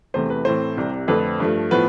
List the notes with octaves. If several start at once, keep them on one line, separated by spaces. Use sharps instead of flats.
E2 C3 E3 A3 C5
B4
A2 E3 A3 C4 C5
C2 C3 G3
F2 D3 A3 C4 B4
G2 F3 A3
A2 F3 B3 B4